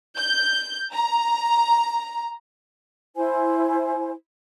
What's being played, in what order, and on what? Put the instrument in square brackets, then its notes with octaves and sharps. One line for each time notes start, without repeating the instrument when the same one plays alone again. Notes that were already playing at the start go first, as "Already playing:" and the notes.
[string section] G6
A#5
[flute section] E4 C5 G#5